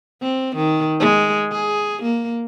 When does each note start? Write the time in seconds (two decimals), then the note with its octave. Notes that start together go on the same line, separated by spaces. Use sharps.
0.21 C4
0.56 D#3
1.00 G#3
1.52 G#4
2.02 A#3